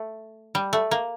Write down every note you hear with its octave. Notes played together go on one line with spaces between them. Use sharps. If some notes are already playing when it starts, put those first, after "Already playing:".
Already playing: A3
G3
A3
A#3